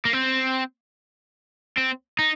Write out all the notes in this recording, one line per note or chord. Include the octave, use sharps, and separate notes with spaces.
A#3
C4
C4
D#4